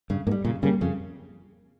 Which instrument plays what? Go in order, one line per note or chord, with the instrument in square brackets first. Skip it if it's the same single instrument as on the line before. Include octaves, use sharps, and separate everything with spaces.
[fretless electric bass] G2 [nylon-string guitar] C#3
[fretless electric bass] G#2 [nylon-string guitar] A#3
[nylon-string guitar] G3
[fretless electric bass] A#2 [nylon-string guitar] C#3
[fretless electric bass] C#3 [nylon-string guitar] G3 A#3
[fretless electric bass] F2 [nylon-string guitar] C#3